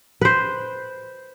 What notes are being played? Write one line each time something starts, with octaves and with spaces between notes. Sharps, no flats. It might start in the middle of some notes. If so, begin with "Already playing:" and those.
B4 C5